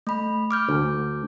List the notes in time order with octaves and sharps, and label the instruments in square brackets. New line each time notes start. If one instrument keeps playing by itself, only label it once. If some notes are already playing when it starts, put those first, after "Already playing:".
[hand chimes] A3 B5
D6 F6 G6
[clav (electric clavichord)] D2